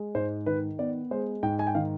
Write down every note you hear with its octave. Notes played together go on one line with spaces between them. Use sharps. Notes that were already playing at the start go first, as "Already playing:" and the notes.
Already playing: G#3
G#2 C5
D#3 B4
B3 D5
G#3 C5
G#2 G5
G#5
G5
D#3 F5